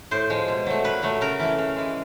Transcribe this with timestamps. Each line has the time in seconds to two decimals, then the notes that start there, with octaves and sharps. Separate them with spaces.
0.11 A2 C5
0.30 F3 G#3
0.48 B2
0.66 F#3 A3
0.84 A#2 B4
1.03 F#3 A3
1.21 C#3 A#4
1.39 E3 A3
1.58 C#3
1.76 E3 G#3